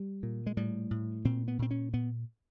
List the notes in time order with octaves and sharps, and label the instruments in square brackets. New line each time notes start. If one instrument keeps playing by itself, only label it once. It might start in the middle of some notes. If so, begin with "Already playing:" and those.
Already playing: [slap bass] G3
A#2
G#3
A2 G3
A2
A#2 C4
B3
A#2 C4
C#4
A#2 B3